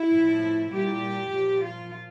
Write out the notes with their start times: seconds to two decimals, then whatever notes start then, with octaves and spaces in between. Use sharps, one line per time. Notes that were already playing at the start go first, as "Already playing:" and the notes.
Already playing: E4
0.12 A2 F3
0.70 A#2 G3 G4
1.31 A#2 F3
1.61 F4